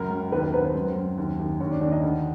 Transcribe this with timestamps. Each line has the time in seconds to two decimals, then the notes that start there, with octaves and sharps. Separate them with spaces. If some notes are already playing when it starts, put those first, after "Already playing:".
Already playing: C#2 F#2 A#4
0.10 F#2
0.32 D#2 B3 B4
0.43 A#4
0.53 D#2 B3 B4
0.64 C4 C5
0.75 F#2
0.96 F#2
1.18 D#2
1.40 D#2
1.60 D#2 C#4 C#5
1.71 D4 D5
1.81 D#2 D4 D5
1.92 D#4 D#5
2.03 D2